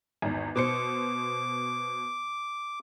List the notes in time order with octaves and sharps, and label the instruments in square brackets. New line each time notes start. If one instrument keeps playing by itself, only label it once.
[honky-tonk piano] G#1 E2
[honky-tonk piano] B2 C5 C#7 [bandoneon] D6